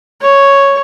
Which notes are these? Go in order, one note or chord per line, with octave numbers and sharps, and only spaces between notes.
C#5